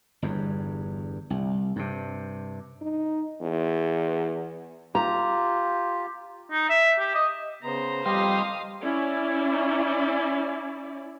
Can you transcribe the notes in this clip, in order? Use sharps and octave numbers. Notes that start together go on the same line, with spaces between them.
G1 E2 G2
C2
G2 C3
D#4
E2
F4 G4 A#5
D#4
E5
G4
D#5
C#3 B3 C5 A#5
F2 G3 G4 D#5 F5 C6 D#6
C#4 E4 D5